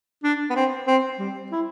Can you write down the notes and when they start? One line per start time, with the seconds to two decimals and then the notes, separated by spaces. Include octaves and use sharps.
0.23 D4
0.50 B3
0.55 C4
0.87 C4
1.19 G3
1.52 E4